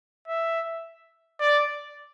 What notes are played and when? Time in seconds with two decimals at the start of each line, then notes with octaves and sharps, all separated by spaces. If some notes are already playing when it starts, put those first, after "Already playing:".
0.28 E5
1.40 D5